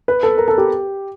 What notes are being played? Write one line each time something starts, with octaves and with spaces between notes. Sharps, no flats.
B4
A4
A#4
A4
G4